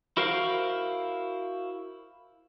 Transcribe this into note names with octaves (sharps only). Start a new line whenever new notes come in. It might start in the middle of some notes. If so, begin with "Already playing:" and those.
E4 F#4 A#4 C5 F5